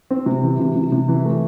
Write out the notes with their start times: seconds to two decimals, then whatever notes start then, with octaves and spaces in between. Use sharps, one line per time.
0.11 C4
0.26 C3
0.43 E3
0.59 C3
0.75 C3
0.92 C3
1.09 E3
1.25 A3